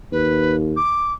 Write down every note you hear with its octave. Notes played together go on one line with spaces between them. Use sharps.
D#2 B4
D6